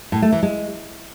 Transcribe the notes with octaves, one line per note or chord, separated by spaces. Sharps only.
A2
A3
E3
G#3